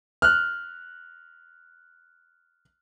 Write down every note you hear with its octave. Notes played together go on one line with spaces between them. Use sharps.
F6 F#6